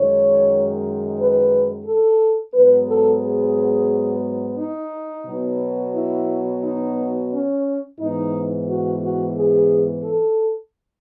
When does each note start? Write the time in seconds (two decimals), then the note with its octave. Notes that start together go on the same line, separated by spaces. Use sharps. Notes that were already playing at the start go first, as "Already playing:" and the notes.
Already playing: F#2 D#3 G#3 C#5
1.18 B4
1.86 A4
2.54 G#2 F#3 B3 B4
2.87 A4
3.22 G#4
4.59 D#4
5.26 B2 F#3 B3
5.95 E4
6.63 D#4
7.31 C#4
7.99 G#2 E3 B3 D#4
8.67 F#4
9.01 F#4
9.35 G#4
10.04 A4